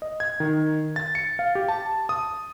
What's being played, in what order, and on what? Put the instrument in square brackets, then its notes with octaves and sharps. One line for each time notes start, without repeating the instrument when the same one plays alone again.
[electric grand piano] D#5
G#6
D#3
A6
C#7
F5
G4
A5
D#6